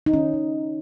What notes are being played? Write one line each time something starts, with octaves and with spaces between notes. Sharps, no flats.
D#4
D#3 C#4
D#3